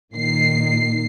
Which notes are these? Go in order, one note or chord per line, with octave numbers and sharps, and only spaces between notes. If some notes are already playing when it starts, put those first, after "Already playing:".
A#2 D#3 C7